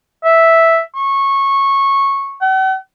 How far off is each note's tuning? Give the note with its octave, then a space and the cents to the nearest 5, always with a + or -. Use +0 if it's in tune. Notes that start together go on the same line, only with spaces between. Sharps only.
E5 -5
C#6 -15
F#5 +45